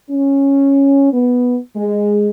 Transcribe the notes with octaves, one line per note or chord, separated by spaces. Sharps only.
C#4
B3
G#3